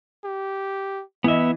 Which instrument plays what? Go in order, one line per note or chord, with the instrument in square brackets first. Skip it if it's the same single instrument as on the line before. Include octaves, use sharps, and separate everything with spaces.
[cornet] G4
[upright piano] E3 D#5 [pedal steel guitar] B3 E5 [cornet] E4